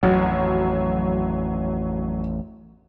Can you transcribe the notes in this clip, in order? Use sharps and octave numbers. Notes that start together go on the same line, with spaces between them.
A1 F2 F#3